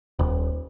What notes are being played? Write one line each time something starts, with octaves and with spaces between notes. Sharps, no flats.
D#1